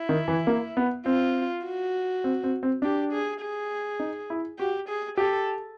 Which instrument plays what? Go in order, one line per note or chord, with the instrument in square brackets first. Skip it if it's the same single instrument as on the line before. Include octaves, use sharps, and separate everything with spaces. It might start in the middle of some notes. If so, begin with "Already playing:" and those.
Already playing: [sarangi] E4
[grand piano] D#3
E3
A#3
B3
[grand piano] C4 [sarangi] F4
[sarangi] F#4
[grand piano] C4
C4
C4
[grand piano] D4 [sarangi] G4
[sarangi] G#4
G#4
[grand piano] D#4
E4
[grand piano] F#4 [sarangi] G4
[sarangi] G#4
[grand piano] G4 [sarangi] A4